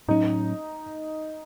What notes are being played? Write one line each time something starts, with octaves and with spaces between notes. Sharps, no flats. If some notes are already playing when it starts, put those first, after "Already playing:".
A2 F#3 C#4 D#4